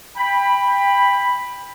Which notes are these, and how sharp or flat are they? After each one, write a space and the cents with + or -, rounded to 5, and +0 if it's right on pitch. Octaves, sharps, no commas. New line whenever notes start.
G5 +25 B5 +0